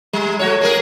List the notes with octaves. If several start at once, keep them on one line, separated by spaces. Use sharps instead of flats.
G3
A3 F#4 C#5
A#3 G#4 A#4